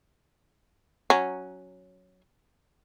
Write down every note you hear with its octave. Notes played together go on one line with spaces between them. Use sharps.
F#3 C#4